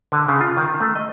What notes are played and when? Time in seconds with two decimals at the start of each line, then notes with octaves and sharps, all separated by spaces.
0.12 D3
0.28 C#3
0.41 F4
0.57 D#3
0.80 A3
0.95 D#5